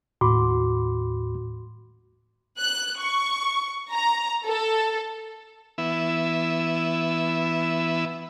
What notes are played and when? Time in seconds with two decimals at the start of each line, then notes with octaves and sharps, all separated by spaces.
0.21 D#2 A2 F#4 B5 C6 D6
2.59 F#6
3.01 C#6
3.92 A#5
4.47 A4
5.78 E3 B3 E4 E5